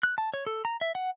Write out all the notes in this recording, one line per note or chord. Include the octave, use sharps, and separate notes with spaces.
F#6
A5
C#5
A4
A#5
E5
F#5